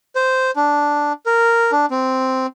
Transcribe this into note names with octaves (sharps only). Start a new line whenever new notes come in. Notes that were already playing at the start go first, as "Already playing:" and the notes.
C5
D4
A#4
D4
C4